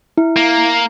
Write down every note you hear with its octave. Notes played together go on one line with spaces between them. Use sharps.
E4
A#3